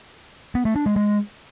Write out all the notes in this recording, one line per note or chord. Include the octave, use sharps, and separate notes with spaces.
B3
A3
D4
G#3
G#3